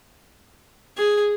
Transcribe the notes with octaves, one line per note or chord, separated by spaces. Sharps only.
G#4